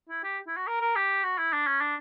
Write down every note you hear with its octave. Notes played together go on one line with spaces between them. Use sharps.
E4
G4
E4
F#4
A#4
A#4
G4
F#4
E4
D4
C#4
D4